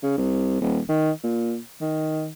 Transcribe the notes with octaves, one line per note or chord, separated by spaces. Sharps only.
C#3
C2
D#1
D#3
A#2
D#3